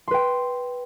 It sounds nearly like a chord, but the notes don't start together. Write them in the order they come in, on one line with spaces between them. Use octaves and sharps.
C6 B4 G5